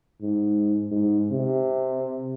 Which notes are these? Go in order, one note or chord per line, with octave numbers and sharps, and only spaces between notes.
G#2
G#2
C3